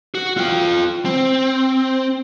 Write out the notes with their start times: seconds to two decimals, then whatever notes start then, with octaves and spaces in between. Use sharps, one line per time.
0.15 F#4
0.38 F4 G5
1.05 C4